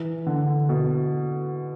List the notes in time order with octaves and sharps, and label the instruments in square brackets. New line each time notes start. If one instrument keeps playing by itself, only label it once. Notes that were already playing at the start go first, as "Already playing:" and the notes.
Already playing: [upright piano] E3
D3
B2